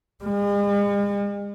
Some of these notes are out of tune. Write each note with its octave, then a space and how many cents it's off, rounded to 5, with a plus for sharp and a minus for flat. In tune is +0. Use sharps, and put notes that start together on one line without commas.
G#3 -45